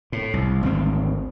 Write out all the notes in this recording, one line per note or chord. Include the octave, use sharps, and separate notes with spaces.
A2
C2
G#1 D2 C4